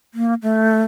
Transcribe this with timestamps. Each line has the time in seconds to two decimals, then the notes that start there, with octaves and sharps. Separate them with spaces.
0.14 A#3
0.43 A3